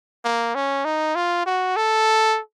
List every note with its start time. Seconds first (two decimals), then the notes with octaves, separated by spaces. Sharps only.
0.25 A#3
0.55 C#4
0.85 D#4
1.15 F4
1.46 F#4
1.76 A4